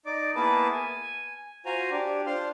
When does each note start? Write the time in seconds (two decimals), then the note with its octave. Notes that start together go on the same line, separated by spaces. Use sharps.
0.06 D#4 D5 D6
0.35 A#3 B3 E4 G#4 B4 A5
0.72 G#5
1.66 F4 F#4 C5 G#5 A#5
1.91 D4 G4
2.26 D4 F4 C5 C6 F6